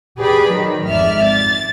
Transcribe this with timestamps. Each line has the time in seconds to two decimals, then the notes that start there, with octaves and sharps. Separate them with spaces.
0.19 G4 G#4 B4 D5 B5
0.49 D#3 F#3
0.88 G#1 F2 D5 E5 F6
1.26 A6